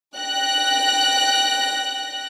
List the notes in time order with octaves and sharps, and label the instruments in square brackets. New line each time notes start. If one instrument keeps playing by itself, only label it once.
[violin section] G5 F#6 A#6